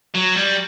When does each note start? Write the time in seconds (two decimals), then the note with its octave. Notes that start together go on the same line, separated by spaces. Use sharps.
0.14 F#3
0.35 G3